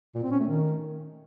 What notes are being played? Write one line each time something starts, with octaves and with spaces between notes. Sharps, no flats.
A#2
C4
C#4
A3
D#3